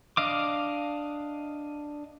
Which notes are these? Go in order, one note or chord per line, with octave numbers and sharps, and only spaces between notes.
D4 D#5 F5 D6